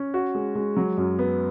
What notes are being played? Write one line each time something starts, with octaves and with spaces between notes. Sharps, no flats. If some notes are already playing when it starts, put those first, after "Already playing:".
Already playing: C#4
F#4
G#3
G#3
F#3
F#2
B3